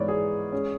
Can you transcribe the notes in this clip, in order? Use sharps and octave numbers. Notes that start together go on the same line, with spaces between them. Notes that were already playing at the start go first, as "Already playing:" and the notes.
Already playing: G#2 E3 B3 C#5 D5
G#4
G#3 C#4